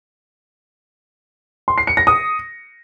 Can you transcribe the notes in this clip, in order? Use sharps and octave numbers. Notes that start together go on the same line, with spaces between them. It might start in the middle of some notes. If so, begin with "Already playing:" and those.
C6
C7
C#7
A#6
D#6